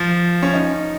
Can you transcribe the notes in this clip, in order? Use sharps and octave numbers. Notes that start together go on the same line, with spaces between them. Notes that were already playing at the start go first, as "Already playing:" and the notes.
Already playing: F3
C#4
D#4